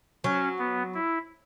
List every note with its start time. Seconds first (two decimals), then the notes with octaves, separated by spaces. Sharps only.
0.24 F#3 C#4
0.59 B3
0.94 E4